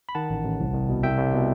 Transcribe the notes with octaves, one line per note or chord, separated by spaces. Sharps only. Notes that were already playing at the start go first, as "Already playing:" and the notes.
B5
D#3 F#5 A5
A1
A1
C2
C2
B2
C2 E5 G5
C2
B2